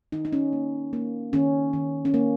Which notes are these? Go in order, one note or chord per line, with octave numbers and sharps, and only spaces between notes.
D#3 D#4
D#4
C#4
A#3
A#3
D#3 C#4
D#3
C#4
A#3